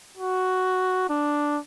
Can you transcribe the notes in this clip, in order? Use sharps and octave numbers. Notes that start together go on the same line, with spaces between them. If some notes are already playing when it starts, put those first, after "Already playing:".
F#4
D4